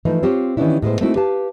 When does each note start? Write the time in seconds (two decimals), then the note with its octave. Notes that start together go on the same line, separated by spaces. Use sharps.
0.05 E3 F3 A3 D#4
0.23 C4 F4 G4 C5 C#5
0.57 D#3 E3 B3 C#4 D4 E4
0.82 A2 G#3 B3 C5
1.01 A3 A#3 C4 D#4 E4 F#4
1.16 G4 B4 F5 A5